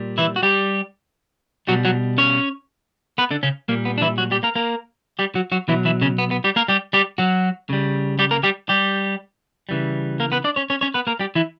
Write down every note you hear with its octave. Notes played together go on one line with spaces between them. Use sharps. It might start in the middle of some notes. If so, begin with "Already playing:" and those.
Already playing: A#2 G3
E3 E4
F#4
G3 G4
B2 F#3 G3 F#4
F#3 F#4
C#4 C#5
B3 B4
D3 D4
C#3 C#4
A#2 G3 A#3
B3
D4
E3 E4
F#3 F#4
G3 G4
A#3 A#4
A#3 A#4
G3 G4
F#3 F#4
F#3 F#4
B2 E3 F#3 E4
E3 E4
C#3 C#4
B3
B3
G3 G4
A#3 A#4
G3 G4
G3 G4
F#3 F#4
C#3 G3
G3 G4
A#3 A#4
G3 G4
G3 G4
C#3 E3 G3
A#3 A#4
B3 B4
D4 D5
C#4 C#5
C#4 C#5
C#4 C#5
B3 B4
A#3 A#4
G3 G4
E3 E4